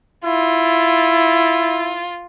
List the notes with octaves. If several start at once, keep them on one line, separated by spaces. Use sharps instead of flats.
E4 F4